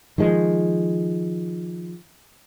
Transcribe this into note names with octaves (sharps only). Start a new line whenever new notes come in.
D#3 F3 G#3